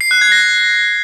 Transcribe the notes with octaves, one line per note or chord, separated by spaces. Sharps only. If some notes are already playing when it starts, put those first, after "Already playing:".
C7
F#6
G#6
A#6